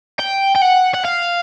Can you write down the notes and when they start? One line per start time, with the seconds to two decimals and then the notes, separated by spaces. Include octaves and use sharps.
0.19 G5
0.55 G5
0.61 F#5
0.94 F#5
1.04 F5